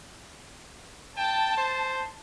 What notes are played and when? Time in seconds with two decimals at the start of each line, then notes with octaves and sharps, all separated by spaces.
1.17 G5 A5
1.58 C5